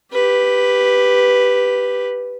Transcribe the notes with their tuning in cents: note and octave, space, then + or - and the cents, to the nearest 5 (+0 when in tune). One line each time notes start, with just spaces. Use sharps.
G4 +0 B4 +0